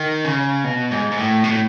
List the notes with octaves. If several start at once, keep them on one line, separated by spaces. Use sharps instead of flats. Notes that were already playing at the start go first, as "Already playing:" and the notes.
Already playing: D#3
C#3
B2
G#2
G#2
A2
B2
A2